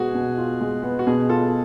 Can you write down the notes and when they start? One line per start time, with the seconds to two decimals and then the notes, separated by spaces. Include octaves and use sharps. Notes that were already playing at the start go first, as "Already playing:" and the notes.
Already playing: B2 G#3 B3 F#4 G#4
0.14 B2
0.38 F4
0.61 G#3
0.83 B3
0.99 F#4
1.07 B2 G#4
1.29 F4 A4